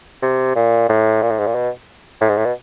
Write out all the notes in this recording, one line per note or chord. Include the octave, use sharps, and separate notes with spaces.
C3
A#2
A2
A#2
A2
G#2
A#2
B2
A2
G#2
A2
B2